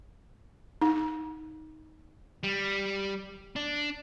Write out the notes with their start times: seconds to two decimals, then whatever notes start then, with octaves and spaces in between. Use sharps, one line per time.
0.81 D#4
2.43 G3
3.56 D4